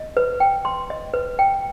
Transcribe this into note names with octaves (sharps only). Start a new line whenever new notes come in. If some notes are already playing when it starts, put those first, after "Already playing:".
Already playing: D#5
B4
G5
C6
D#5
B4
G5